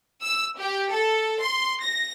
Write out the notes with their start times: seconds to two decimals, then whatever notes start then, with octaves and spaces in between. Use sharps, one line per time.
0.23 E6
0.58 G4
0.91 A4
1.41 C6
1.82 A#6